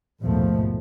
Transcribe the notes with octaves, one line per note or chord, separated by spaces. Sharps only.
A#1 D#2 G#2 B2 F3 A3